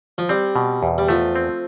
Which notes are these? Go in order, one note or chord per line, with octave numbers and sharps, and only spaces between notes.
F3
G3 C4
B2
E2
G3
F3 A3
C4